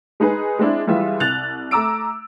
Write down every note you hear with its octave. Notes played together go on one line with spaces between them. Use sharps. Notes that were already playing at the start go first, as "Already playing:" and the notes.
G#3 D#4 G#4 B4
G#3 C4 D4 E4
E3 G3 G#3 F4 E5
C2 F#6 A6 F7
A3 A#5 D6 E6 D7